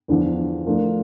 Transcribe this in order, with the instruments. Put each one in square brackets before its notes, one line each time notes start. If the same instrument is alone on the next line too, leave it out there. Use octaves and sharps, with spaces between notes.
[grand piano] E2 D3 F3
F3 A3 D4 F4 A#4